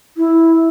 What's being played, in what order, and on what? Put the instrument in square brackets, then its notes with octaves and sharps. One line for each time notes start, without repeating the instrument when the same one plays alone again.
[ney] E4